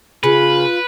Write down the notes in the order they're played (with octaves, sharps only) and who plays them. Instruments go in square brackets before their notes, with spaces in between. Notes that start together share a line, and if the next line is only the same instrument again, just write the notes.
[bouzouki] C#3 [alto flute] F4 [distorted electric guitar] B4